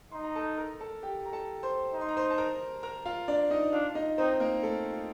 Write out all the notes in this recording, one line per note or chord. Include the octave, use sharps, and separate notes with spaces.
D#4 C6
A#5
A4 A5
A#4 A#5
A4 A5
G4 G5
A#5
A4 A5
C5 C6
D#4
C6
A#5
C5 C6
A5
A#4 A#5
A#4 A#5
F4 F5
D4 D5
D#4 D#5
D4 F4 F5
D#4 D#5
C4 D#4 C5
A#3 A#4
A3 A4
F4